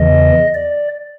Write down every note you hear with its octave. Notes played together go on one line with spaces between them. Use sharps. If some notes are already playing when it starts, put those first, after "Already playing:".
Already playing: E2 C#3 E3 D#5
D5